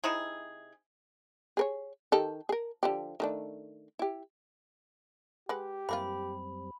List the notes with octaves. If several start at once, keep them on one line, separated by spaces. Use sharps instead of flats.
C3 D#4 E4 G#4
G#4 A#4 C#5
D#3 G4 A4
G#4 A#4
D3 F3 G4
D#3 A3 D4
E4 G4
G#3 G4 B4 F#5
F#2 E3 G3 A#3 C4 F4 B5